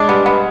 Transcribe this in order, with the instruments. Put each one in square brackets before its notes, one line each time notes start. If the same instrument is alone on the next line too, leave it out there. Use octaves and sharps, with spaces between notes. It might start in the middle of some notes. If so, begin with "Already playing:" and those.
Already playing: [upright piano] G#3 [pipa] D4
[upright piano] G3 [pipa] B3
[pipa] B3